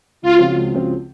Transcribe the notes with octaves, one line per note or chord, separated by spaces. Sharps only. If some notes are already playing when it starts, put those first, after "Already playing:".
C#2 F4
C#3 F3 C4 F#4
C#2
C#3 F3 C4 F#4